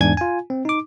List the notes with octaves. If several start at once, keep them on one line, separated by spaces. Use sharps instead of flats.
E2 G#2 D4 G#5 G#6
F4 G#5
C4
D#4 D6